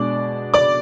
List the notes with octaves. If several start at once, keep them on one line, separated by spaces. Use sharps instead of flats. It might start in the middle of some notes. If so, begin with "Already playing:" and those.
Already playing: B2 G#3 D4 D5 D6
D5 D6